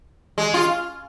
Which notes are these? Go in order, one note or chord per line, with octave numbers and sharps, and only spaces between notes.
G#3
F4